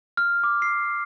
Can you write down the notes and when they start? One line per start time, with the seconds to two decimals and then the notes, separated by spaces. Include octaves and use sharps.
0.17 F6
0.44 D6
0.62 C7